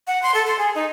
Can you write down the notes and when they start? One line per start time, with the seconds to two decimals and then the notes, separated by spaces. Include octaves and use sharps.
0.07 F#5
0.23 C6
0.35 A4
0.47 C6
0.59 G#4
0.75 D#4